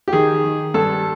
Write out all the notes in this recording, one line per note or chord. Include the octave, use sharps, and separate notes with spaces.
G4
D#3 G#4
D#3
G2 A4